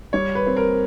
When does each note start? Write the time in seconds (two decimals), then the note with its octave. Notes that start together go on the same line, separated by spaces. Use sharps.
0.13 G3 C#5
0.35 B4
0.47 C4
0.57 A#4